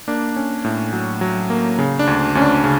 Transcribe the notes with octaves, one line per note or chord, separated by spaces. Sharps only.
A#3 D4
C#4
A2
F#3
F#3
A#3
C#3
D4
D2
D2 C#4
D4
C#3